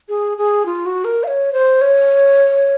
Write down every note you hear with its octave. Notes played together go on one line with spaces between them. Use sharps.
G#4
G#4
F4
F#4
A#4
F5
C#5
C5
C#5